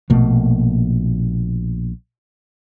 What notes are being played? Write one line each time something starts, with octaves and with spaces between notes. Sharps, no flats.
A#1 B2 A3 A#3